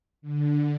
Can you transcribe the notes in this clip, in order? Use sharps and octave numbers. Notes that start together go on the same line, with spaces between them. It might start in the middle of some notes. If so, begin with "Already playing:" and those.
D3